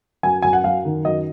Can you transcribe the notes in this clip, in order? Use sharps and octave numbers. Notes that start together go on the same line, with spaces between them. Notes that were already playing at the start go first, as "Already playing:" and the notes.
F#2 G#5
F#2 G#5
F#5
F#2 F5
D#3
F#2 D#5